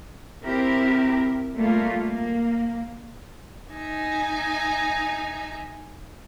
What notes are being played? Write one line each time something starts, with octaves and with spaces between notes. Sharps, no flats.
C4 E4 G4 A#4
G3 A3 A#3 F4
A#3
D#4 E5 G#5